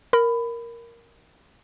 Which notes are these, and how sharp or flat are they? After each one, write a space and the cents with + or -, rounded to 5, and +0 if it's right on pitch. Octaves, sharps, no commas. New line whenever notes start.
A#4 +0 B5 +15